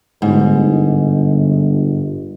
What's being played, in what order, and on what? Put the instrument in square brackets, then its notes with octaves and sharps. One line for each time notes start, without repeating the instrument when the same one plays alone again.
[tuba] G1 [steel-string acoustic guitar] G#2